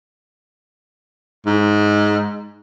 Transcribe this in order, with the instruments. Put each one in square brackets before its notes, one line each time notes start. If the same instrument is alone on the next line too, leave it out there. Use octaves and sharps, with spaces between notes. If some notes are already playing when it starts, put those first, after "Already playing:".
[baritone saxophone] G#2